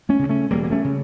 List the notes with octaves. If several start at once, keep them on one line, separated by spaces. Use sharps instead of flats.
A3 C#4
D2 C#3
A3 C#4
E1 G3 A#3
A#3
A3 C#4
C#3